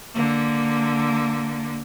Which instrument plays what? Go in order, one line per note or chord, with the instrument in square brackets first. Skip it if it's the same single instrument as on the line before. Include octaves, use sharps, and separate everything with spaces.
[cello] D3 A#3